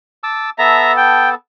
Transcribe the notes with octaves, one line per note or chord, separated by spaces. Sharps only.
A5 D6 E6
B3 A4 E5 A5 A#5
G5